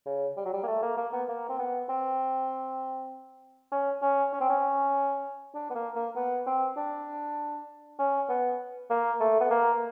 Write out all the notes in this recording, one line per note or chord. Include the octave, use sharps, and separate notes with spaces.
C#3
G3
F#3
G3
A#3
A3
A#3
A#3
B3
A#3
C4
B3
C4
C#4
C#4
C#4
C4
C#4
D4
B3
A#3
A#3
B3
C4
D4
C#4
B3
A#3
A3
B3
A#3